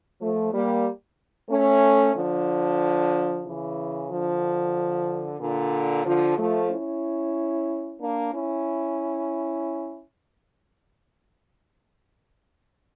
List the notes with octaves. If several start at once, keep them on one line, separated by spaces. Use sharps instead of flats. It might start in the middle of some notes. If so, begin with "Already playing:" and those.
F3 A3
G3 A#3
A3 C#4
D3 F3
C#3 E3
D3 F3
A#2 D3
D3 F3
F3 A3
C#4 E4
A#3 D4
C#4 E4